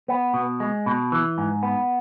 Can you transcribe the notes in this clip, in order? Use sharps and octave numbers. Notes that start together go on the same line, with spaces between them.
B3
B2
G#3
B2
E3
G#2
B3